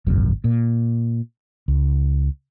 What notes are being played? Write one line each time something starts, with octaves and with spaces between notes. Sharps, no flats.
G#1 C#2 F#2 B2
A#2
C#2